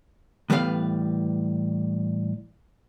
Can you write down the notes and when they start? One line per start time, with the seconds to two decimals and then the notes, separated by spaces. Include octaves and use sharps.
0.50 A2 E3 G3 B3 B4 F5